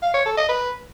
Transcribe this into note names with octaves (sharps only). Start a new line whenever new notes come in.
F5
C#5
A4
D#5
B4